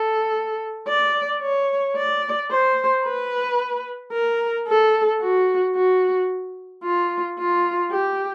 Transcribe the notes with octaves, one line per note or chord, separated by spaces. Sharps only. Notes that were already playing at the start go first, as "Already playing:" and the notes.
Already playing: A4
D5
C#5
D5
C5
B4
A#4
A4
F#4
F#4
F4
F4
G4